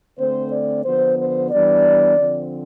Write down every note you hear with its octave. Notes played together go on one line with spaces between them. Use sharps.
D3 A3 C4 C5
D5
D3 F3 B3 C5
C5
E3 G3 B3 D4 D5
D3 F3 C4